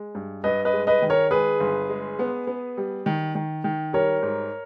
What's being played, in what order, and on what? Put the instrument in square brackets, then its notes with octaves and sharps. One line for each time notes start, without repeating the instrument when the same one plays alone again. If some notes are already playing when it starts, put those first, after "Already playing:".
Already playing: [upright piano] G#3
G2
[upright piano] G2 [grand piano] B4 D#5
[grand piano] B4 D#5
[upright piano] G#3
[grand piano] B4 D#5
[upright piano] D#3
[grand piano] A#4 C#5
[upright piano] G#3 [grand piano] G#4 B4
[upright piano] G1
G#3
B3
B3
G3
D#3
D#3
D#3
[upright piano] G3 [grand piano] A#4 C#5
[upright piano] G#2